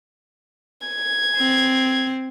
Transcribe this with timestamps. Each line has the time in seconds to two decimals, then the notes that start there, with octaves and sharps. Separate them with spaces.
0.87 G#6
1.37 C4